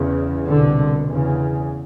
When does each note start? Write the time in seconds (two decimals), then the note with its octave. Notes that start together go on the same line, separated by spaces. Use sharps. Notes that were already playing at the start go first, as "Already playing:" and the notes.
Already playing: E2 C#3
0.48 C2 B2 D3
1.08 E2 C#3